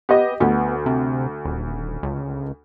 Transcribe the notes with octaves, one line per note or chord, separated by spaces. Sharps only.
B3 G4 D#5
D2 B3
C3
D#1
C#2